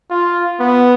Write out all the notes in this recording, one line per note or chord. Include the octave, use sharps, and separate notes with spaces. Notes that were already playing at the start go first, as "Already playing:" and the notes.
F4
B3